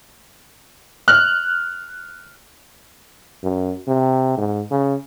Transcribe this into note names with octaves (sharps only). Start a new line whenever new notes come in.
F6 F#6
F#2
C3
G#2
C#3